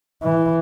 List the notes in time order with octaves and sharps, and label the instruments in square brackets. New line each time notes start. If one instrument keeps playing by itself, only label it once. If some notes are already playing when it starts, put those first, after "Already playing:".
[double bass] E3